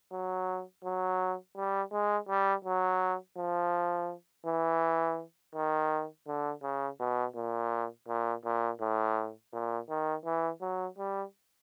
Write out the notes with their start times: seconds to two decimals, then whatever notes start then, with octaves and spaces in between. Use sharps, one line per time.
0.12 F#3
0.84 F#3
1.57 G3
1.92 G#3
2.29 G3
2.65 F#3
3.37 F3
4.46 E3
5.55 D#3
6.28 D3
6.63 C#3
7.00 B2
7.36 A#2
8.08 A#2
8.45 A#2
8.81 A2
9.53 A#2
9.89 D#3
10.25 E3
10.61 F#3
10.98 G3